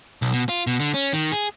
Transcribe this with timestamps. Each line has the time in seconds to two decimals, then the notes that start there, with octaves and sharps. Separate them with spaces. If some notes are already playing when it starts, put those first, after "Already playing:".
0.22 B1
0.33 B2
0.49 F4
0.67 B2
0.80 D3
0.94 C#4
1.13 D#3
1.32 G#4